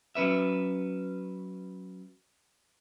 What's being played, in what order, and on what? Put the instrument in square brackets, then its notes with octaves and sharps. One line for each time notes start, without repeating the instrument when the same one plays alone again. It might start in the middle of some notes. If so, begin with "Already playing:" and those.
[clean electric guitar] F#3 C#4 B4 E5